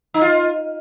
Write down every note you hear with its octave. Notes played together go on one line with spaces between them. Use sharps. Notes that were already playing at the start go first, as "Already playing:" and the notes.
D#4
F4